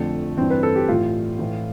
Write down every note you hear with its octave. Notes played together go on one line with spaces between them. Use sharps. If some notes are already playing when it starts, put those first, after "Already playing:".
Already playing: F2 D3 F3 A3
G2 E3 C4
B4
A4
G4
A2 E3 F4
A2 E3